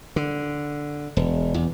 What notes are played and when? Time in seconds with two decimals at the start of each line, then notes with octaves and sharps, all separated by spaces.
0.16 D3
1.17 E1
1.54 E2